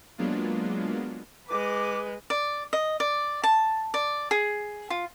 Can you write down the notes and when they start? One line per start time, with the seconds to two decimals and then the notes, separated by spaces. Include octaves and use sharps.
0.18 F#3 G#3 A#3 B3 D4 F4
1.48 G#3 B4 D6
2.30 D5
2.73 D#5
3.00 D5
3.44 A5
3.94 D5
4.31 G#4
4.90 F4